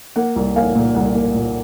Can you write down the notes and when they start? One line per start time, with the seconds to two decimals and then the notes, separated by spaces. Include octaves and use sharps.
0.16 A#3 F#5
0.36 C2
0.56 A#3 F5 G#5
0.76 A#2
0.95 C2 F#5
1.15 A#3
1.34 A#2